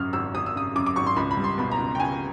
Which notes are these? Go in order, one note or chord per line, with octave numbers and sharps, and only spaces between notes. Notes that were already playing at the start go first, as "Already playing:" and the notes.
Already playing: G#1 F#2 C#3 D#6 F6
G#1 E6
G#1 D#6
E6
C#3 D#6
F#2 D6
D6
G#1 C#6
C6
C#2 B5
B5
G3
C6
B2 B5
A#5
C#2
G5
C#2 G#5